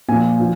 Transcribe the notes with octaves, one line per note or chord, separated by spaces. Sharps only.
A#2 F3 G#5
F3